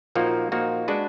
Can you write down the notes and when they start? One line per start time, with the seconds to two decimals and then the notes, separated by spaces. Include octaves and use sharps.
0.15 A#2 F3 A#3 D#4 F#4
0.52 A#2 F3 A#3 D#4 F#4
0.88 G#3 D4 F#4 B4 D5